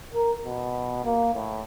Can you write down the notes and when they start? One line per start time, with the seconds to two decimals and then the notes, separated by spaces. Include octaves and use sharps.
0.14 A#4
0.45 B2
1.04 A#3
1.34 A2